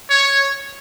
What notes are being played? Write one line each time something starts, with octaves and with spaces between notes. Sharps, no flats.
C#5